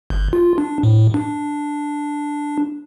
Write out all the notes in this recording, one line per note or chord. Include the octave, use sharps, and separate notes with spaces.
G1
F4
D4
A2
D4